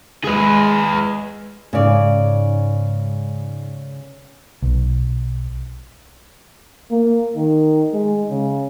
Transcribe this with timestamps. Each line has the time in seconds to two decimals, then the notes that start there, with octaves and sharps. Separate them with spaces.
0.24 G#3 G#4 B4
1.73 G#2 C#3 D5
4.62 B1
6.90 A#3
7.36 D#3
7.93 G#3
8.30 C#3